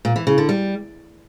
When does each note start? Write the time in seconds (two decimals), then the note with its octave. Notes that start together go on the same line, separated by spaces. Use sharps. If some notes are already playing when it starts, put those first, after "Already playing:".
0.05 A#2
0.16 E3
0.27 C#3
0.38 D3
0.49 G3